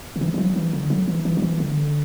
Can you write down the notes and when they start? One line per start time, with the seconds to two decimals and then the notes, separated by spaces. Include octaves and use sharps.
0.16 D3
0.21 E3
0.34 E3
0.38 F#3
0.56 E3
0.73 D3
0.90 F#3
1.08 E3
1.25 E3
1.37 F#3
1.42 E3
1.60 D3